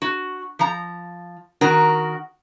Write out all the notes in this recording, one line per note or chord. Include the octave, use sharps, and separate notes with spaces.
F#4
F3 A#5
D#3 F#4 A#4